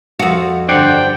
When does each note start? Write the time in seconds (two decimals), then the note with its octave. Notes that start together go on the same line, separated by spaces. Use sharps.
0.19 F2 F#4
0.69 G2 D3 D4 C5 D5 F#5 G5